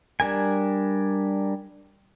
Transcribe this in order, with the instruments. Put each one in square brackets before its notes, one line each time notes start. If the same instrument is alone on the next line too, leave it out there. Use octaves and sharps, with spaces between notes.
[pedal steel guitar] G3 D4 A#4 G#5